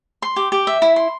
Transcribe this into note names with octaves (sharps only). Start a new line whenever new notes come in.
C6
G4
G4
E5
E4
C6